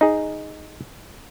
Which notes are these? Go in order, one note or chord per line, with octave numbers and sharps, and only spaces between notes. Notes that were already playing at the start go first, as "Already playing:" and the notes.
D#4 G#4